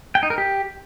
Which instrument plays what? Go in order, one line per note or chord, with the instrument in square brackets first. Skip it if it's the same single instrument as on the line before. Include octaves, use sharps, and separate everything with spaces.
[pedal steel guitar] G5
D#4
A#4
G4